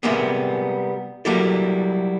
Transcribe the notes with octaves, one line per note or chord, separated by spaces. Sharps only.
C3 G3 G#3 A#3 B3
F#3 G3 A#3 E4 A4